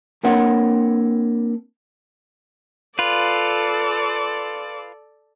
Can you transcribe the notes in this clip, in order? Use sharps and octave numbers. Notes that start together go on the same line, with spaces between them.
A#3 C4 D4 A#4 C#5 F#5
F4 A4 B4 D5